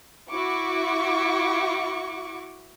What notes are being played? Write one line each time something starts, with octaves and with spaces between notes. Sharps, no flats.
E4 F#4 C#6 D6